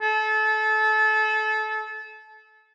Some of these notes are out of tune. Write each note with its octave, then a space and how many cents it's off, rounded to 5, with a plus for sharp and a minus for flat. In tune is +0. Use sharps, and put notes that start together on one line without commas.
A4 -30